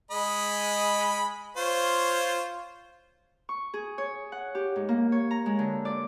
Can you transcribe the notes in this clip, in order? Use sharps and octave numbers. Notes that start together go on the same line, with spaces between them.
G#3 D#5 B5
F4 C5 C#5
C#6
G#4
C#5
F#5
G4
G#2
A#3
C#5
A#5
G#3
D3
D5